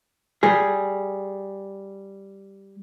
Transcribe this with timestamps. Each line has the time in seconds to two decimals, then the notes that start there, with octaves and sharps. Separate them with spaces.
0.43 G3 G#4